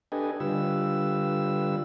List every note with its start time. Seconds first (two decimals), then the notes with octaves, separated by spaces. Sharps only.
0.12 D4 G4 A4 B4 D#5 G#5
0.40 D3 G3 F4 B4 E6